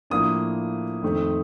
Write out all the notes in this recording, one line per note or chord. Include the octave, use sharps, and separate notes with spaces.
A2 F3 A#3 D4 D#6
F2 D#3 A3 C4